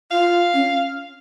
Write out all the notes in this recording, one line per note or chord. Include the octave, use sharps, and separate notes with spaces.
F4 F5
C#4